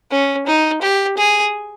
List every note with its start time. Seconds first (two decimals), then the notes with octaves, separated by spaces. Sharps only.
0.11 C#4
0.47 D#4
0.82 G4
1.17 G#4